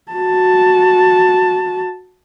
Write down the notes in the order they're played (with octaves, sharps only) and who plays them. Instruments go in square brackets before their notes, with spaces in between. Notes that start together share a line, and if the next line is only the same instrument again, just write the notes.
[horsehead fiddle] F#4 A5